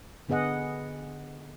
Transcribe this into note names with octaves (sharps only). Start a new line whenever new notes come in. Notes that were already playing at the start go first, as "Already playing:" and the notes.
D3 B3 G#4 D#5 F#5